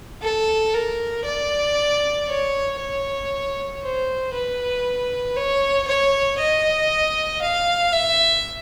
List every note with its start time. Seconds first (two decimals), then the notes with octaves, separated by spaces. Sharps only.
0.22 A4
0.74 A#4
1.25 D5
2.28 C#5
2.79 C#5
3.82 C5
4.33 B4
5.37 C#5
5.88 C#5
6.39 D#5
7.42 F5
7.93 E5